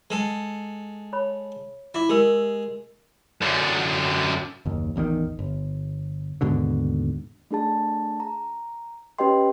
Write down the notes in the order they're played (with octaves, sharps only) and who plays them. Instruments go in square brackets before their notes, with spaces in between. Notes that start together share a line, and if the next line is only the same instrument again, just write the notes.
[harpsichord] G#3 A4
[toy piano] C#5 B5
[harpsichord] E4 [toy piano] E5 D6
[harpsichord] G#3 [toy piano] G4 A#4 E6
[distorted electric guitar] F#2 D3
[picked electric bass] F#1 D#2
A1 E2 C3 D#3
G1
D#2 G#2 B2 D3
[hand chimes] A3 D4 G#4 A5
A#5
C#4 G4 B4 D#5 G5 C6